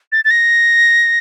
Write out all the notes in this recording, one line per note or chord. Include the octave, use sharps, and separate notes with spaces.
A6
A6
A#6